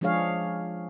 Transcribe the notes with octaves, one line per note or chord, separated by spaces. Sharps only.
F3 G#3 D4 G#4 C#5 F5